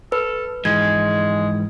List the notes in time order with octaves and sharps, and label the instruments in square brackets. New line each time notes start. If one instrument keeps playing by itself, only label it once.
[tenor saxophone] A4 [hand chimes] B4
[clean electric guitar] G#2 E3 F3 [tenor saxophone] G#3 [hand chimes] G#6